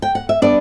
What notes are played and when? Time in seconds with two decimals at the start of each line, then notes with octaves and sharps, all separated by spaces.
0.02 G5
0.15 F#5
0.29 E5
0.42 G3 B3 D4 D5